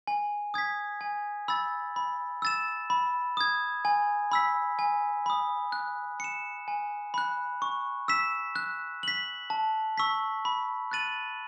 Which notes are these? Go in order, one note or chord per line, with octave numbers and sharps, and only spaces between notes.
G#5
D#6 G#6 B6
G#5
B5 E6 A6
B5
E6 A6 E7
B5
D#6 G#6
G#5
B5 E6 B6
G#5
B5 D#6
F#6
C#7 E7
G#5
B5 F#6
C#6
E6 B6 E7
F#6
B6 F#7
A5
C#6 E6 B6
B5
F#6 A6 D#7 F#7